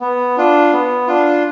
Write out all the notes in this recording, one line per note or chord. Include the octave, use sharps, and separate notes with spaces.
B3
D4 F4
B3
D4 F4